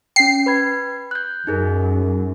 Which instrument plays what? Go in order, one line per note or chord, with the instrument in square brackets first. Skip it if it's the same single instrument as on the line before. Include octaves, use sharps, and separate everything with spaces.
[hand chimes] C#4 G5 [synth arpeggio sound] C7
[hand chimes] B4 B5 G#6
F#6 G6
[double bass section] F#2 [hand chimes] D#4 G#4 A#4